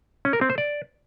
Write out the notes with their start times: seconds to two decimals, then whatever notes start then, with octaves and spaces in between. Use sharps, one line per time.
0.25 C#4
0.33 A#4
0.41 C4
0.50 C5
0.58 D5